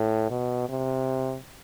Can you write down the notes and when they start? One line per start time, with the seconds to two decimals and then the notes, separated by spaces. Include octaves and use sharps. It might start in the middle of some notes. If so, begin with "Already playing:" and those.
Already playing: A2
0.30 B2
0.69 C3